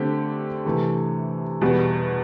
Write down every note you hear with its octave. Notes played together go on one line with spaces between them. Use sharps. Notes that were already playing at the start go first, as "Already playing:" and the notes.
Already playing: D3 A3 C4 G4
C3 E3 A3
E2 B2 G3 B3